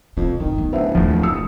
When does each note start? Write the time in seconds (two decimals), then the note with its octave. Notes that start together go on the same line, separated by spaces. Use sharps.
0.17 F2 C3
0.40 D1 G1 D#3
0.58 B3
0.72 D1 B4 C5 E5
0.95 D#2 F3 G3 A3
1.23 E1 D#6 E6 C#7